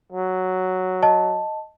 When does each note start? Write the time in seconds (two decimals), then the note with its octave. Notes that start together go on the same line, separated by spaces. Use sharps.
0.12 F#3
1.03 D#5 A5